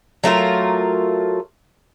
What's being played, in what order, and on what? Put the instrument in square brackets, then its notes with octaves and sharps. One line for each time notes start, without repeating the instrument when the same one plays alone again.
[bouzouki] F#3 A3 F4 A#4